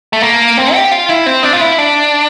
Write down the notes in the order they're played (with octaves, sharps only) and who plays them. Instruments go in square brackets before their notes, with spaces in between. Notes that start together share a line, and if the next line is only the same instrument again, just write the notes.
[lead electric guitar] A3
A#3
C4
G4
F4
E4
C4
D4
F4
E4
D4